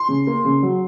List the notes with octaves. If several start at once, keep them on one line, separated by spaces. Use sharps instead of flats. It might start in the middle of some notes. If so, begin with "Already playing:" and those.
Already playing: C6
C#3
A#3
C#3
F#3